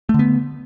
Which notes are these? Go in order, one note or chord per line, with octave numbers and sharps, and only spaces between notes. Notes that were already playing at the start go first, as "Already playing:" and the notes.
D3 A3 B3